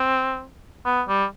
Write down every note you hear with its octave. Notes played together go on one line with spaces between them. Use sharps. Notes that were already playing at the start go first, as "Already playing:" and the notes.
Already playing: C4
B3
G3